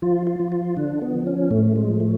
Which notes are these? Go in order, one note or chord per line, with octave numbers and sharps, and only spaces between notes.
F3 F4
F4
F3
F4
D3 D4
B3
F3
C#4
A2 A3
G#3
F3
A3